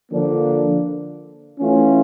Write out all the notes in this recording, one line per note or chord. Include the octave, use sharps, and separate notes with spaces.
D3 F3 A#3 D4
E3 A3 C#4 F4